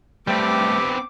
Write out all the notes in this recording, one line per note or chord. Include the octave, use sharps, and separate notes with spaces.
G3 A3 B3 C4 G4 D6